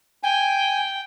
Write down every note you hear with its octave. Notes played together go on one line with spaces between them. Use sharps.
G5 G#5